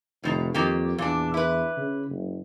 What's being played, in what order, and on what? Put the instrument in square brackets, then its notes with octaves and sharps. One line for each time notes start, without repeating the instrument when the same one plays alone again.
[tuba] F1 [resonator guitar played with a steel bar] A2 D#3 A#5
[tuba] F2 [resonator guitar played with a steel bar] D#3 A#3 G4
[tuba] E2 [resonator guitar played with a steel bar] A#2 D4
[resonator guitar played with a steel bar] E4 B4
[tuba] C#3
F#1